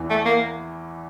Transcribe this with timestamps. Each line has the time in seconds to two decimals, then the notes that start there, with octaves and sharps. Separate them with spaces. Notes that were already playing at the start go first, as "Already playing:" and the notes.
Already playing: E2 E3
0.10 A3
0.26 A#3